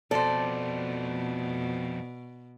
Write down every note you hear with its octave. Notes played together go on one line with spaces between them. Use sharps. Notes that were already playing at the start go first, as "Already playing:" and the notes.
F2 B2 A3 A4 C5 D5